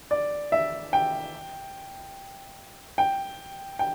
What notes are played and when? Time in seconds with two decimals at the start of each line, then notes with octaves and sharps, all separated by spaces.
0.11 D5
0.52 E5
0.93 G5
2.98 G5
3.79 G5